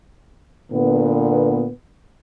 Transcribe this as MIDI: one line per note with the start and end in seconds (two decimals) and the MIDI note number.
0.71 1.70 46
0.71 1.70 50
0.71 1.70 59